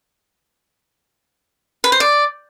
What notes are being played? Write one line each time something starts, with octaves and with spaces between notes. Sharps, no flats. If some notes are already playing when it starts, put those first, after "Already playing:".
B4
C5
D5